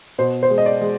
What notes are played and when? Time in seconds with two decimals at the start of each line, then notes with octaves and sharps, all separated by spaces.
0.18 B2 C5
0.43 C5
0.50 G#3
0.58 D#5
0.66 D5
0.81 G#3